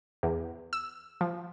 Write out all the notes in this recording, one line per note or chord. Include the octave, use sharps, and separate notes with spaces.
E2
E6
F3